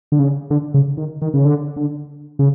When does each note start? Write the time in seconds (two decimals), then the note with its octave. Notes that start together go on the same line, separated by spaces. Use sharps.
0.12 D3
0.19 C#3
0.50 D3
0.74 C#3
0.97 D#3
1.22 D#3
1.34 C#3
1.45 D3
1.77 D3
2.39 C#3